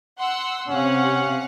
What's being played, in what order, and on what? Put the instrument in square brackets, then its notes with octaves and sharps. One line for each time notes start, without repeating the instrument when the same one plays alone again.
[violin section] F#5 C6 E6
[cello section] C3 [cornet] C#4 [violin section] F5 F#5